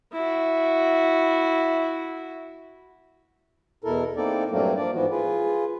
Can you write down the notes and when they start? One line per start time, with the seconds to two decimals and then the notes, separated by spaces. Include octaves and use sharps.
0.13 E4 F#4
3.83 E2 B2 E4 A4 A#4
4.16 A#3 C4 D#4 E4 A4 D5
4.50 G2 A#2 F#3 A3 A#3 C4
4.76 F3 A#3 D4 D5
4.92 G#2 E3 F3 B3 F#4
5.10 F4 G#4 B4